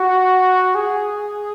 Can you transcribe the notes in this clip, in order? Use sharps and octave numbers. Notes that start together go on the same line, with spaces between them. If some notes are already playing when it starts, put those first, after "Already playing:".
Already playing: F#4
G#4